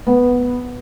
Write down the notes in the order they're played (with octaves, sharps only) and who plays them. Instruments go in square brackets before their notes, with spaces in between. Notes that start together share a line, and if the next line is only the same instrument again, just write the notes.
[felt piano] B3